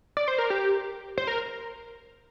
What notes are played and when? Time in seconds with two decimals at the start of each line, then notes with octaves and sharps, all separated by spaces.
0.17 D5
0.28 C5
0.38 A#4
0.50 G4
1.18 C5
1.27 A#4